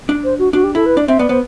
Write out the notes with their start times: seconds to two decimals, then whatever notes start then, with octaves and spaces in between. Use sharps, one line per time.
0.09 D4
0.24 C5
0.39 F#4
0.53 D4 F#4
0.63 G4
0.75 E4 A4
0.86 B4
0.97 D4 D5
1.08 C4 E5
1.19 B3 D5
1.29 B3 C5